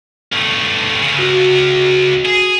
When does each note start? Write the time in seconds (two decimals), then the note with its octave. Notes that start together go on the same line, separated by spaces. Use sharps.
0.32 G2 A3
1.01 C#2 C#3
1.19 F#4
2.26 G#4